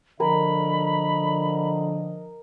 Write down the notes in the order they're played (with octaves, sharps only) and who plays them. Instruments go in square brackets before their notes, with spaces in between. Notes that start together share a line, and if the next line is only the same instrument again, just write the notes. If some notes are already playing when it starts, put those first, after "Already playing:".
[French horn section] D3 [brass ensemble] F3 D#5 [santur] A#4 G#5 [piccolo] B5